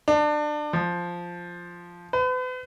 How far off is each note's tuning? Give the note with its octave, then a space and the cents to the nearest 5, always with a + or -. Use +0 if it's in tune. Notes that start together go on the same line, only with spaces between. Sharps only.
D4 +25
F3 +0
B4 +40